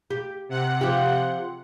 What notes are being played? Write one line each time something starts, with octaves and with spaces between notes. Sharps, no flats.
G4
C3 F#5
F3 G4